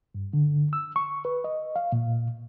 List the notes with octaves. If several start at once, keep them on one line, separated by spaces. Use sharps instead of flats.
G2
D3
E6
C#6
B4
D#5
F5
A#2